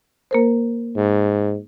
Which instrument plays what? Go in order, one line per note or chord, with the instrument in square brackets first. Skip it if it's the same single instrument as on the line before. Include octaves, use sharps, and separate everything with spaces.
[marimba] A#3 A#4 C5
[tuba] G#2